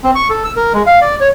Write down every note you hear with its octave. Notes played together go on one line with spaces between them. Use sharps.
C4
C#6
A4
E6
A#4
G#3
F5
D5
C#5